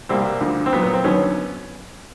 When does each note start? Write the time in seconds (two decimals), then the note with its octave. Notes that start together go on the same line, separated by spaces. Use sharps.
0.09 C2 B2 G3 A#3 C4
0.41 D2 D3 F3
0.66 C4
0.72 A#2 F#3 A#3 B3
0.83 B3
0.93 C4
1.04 D#2 D3 F#3 B3 C#4